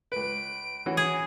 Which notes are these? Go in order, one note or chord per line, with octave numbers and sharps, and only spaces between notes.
C#2 B4 D7
E3 C#4 F#4
G#4